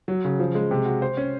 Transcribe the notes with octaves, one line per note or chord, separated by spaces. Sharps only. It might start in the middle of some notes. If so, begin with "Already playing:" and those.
F#3
C#3
F3
G#3
C3
F#4
C5
C#4